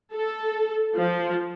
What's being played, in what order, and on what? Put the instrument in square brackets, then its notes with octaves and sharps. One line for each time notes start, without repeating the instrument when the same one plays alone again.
[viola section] A4
F3